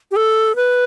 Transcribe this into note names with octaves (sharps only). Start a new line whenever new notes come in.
G4
A4
B4